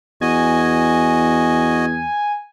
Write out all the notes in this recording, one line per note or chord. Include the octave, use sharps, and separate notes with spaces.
E2 F#4 D#5 G#5